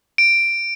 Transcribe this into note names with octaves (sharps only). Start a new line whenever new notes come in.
D7